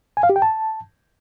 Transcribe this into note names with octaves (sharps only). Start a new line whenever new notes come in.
G#5
F5
G4
G5
A5